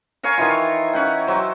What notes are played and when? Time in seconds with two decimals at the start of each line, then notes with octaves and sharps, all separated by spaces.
0.23 A#4 C#5 F5 G#5
0.37 D#3 E3 F4
0.93 C#4 F#5 G5
1.27 F#3 C5